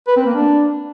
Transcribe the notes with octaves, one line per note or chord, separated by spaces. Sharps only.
B4
C4
A#3
D4